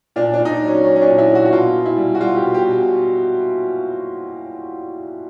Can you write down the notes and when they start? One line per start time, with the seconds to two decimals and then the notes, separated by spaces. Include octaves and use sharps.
0.16 A#2 D4
0.34 A#2 D4
0.45 D#4
0.49 D4
0.62 F#3
0.67 C#4
0.84 F#3 C#4
0.96 C#4
1.02 D4
1.07 A#2
1.18 E4
1.30 A#2
1.35 F#4
1.46 F#4
1.52 B2 F4
1.75 B2
1.86 E4
1.97 G3
2.15 F#4
2.20 G3 F4
2.36 G4
2.43 B2
2.54 G4
2.65 B2